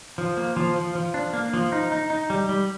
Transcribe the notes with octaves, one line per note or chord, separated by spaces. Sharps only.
F3
A#3
F3
F3
F3
D4
A#3
F3
D#4
D#4
D#4
G3
G3